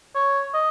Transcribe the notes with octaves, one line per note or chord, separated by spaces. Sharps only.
C#5
D#5